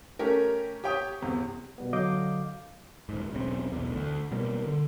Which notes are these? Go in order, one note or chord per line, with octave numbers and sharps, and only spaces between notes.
A3 C#4 G4 A#4
G4 C#5 G5 C#6 D#6
G1 E2 C3
B2 G3 B3
D3 F#3 D#5 F5 D6 G6
D#1 G#2
E1 B1 C#3 C4
B1 E2
D2
B2 G3 A#3
D3